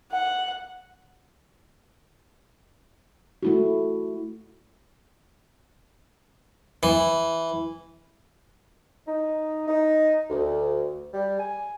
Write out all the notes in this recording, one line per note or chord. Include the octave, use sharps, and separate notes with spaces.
F#5
A3 E4 F#4
E3
D#4
D#4
D2
G3
G#5